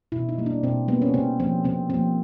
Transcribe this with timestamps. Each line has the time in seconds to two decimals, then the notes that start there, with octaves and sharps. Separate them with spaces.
0.12 B2 E4
0.29 D#4
0.38 G3 A#3
0.46 D4
0.63 B2 C4
0.88 G3 A#3 B3
1.02 C#4
1.14 C3 C4
1.40 F3 A#3 C4
1.64 C3 C4
1.90 F3 A#3 C4